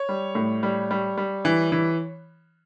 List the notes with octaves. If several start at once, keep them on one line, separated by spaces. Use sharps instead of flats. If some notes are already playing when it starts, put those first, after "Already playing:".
Already playing: C#5
G3
A2
G3
G3
G3
E3
E3